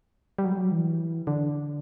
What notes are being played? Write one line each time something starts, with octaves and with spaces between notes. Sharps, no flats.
G3
F#3
G3
F#3
E3
D3